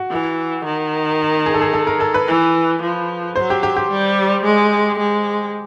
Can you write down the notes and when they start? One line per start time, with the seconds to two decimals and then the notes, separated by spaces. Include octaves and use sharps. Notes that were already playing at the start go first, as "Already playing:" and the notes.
Already playing: F#4
0.11 E3
0.65 D#3
1.46 G#4
1.54 A4
1.61 G#4
1.74 A4
1.87 A#4
2.00 A4
2.14 B4
2.27 E3
2.82 F3
3.36 F#3 C5
3.50 G4
3.63 G4
3.77 G4
3.90 G3
4.44 G#3
4.99 G#3